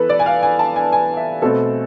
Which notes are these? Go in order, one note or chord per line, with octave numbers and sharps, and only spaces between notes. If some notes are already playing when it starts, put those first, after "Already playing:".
Already playing: E3 B3 A4 B4
D5
G#5
F5
G#5
A5
G#5
G#5
E5
B2 A3 C4 A4